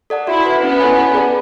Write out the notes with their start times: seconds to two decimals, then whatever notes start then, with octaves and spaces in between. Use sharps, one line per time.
0.10 A4 D5 F#5 A5
0.27 E4 F#4
0.46 B4 F#5
0.63 B3 C#4
0.80 E4 A4 C#5 G#5
0.97 E4
1.14 G#4 D5 A5